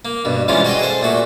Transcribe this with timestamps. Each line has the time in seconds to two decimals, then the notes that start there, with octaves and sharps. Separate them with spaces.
0.05 A#3
0.25 G2 B2
0.48 E3 F3 G3 G#3 C#4 F4
0.65 F#4 G#4 D#5 G5
0.79 G#4 A4 C5
1.01 A#2 A3 F#4